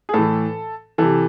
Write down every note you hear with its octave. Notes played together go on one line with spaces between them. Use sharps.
G#4
A2 E3 A4
C3 E3 A4